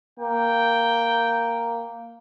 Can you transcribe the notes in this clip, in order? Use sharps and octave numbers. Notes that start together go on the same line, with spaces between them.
A#3 G5